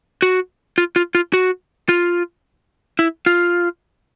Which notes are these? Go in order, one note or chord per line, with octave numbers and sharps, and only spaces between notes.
F#4
F4
F4
F4
F#4
F4
E4
F4